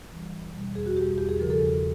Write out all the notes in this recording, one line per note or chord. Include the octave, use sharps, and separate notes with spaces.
E3 G3
E2
B2 G3
E2 G#4
F#4
B2 G3 G4
E2 G4
G#4
C#3 F3 A#4
A4
E2